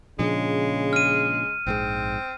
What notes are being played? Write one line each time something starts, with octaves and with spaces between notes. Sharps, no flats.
A#2 C#3 F3 G#3 D4
F6 D#7
A#1 G#2 G#3 C4